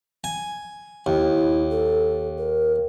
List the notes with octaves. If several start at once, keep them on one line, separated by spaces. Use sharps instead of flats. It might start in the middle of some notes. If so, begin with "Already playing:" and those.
G#5
D#2 E4
A4
A#4